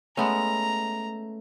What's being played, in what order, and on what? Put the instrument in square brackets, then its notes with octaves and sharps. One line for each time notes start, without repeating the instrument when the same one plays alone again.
[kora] G#3 B3 C#4 [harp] A3 [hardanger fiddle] A#5